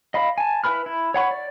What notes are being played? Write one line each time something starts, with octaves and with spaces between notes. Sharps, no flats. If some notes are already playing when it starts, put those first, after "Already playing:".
D#5 F5 B5
G#5 A5
E4 B4 B5 F6
E4
C#5 F#5 B5 C#6
D5